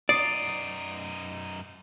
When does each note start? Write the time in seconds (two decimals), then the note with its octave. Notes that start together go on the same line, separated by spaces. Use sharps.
0.09 F#2 D#4 D5 D#6 C7 D7